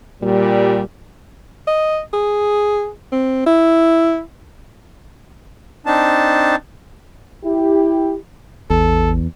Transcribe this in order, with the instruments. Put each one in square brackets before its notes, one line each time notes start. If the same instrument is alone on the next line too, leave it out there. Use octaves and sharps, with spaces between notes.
[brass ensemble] A#2 G3
[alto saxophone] D#5
G#4
C4
E4
[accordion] C4 D4 D#4 A5
[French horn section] E4 G4
[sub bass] A1 [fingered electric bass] E2 [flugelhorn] A4